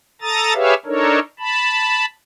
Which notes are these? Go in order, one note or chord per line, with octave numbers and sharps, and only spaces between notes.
A4 A#5 D#6 A6
G4 G#4 B4 C#5 E5 F5
D4 D#4 A4 A#4 C#5
A5 B5